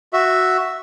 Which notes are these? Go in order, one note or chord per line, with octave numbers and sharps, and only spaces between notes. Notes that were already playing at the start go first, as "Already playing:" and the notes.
F#4 E5